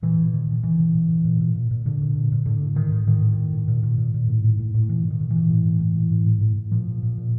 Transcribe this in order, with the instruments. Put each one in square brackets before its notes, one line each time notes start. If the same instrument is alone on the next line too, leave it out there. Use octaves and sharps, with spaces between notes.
[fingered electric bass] A#2 E3
A#2
A#2 D#3
A#2
B2 E3
B2
B2
B2
A#2
A#2
A#2
A#2
A#2 D3
A#2
A#2
A#2
A2 D3
A2
A2 D#3
A2
A2 D#3
A2
A2
A2
A#2
A#2
A#2
A#2
A2
A2
A2
A2
A#2 E3
A#2
D#3
A#2
E3
A#2
A2
A2
A2
A2
A2
A2
A2
A2
A#2 F3
A#2
A#2
A#2